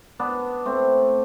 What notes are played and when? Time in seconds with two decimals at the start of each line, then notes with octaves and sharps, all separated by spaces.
0.19 B3 D4
0.65 A3 C4